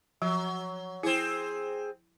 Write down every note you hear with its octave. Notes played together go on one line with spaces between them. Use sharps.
F3 F#3
C4 E4 G#4